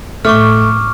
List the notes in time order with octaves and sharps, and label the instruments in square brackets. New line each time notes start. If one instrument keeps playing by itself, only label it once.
[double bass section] A2 [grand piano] A3 [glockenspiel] C#6 D6 F6